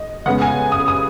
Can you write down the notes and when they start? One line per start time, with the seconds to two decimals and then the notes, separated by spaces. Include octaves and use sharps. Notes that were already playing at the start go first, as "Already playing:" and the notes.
Already playing: D#5
0.26 C#3 G#3 B3 F#5
0.42 G#5
0.72 D#6
0.88 D#6